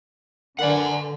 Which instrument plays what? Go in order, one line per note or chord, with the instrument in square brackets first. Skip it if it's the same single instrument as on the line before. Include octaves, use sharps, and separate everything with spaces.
[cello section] D3 [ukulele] A#4 B4 D5 [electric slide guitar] F#5 G#5